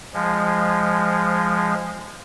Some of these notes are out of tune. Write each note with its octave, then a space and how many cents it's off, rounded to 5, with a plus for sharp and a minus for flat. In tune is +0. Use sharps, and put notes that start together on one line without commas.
F3 -5 G#3 -15